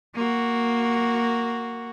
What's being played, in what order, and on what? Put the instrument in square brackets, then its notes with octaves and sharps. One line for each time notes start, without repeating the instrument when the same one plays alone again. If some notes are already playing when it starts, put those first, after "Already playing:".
[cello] A#3 F#4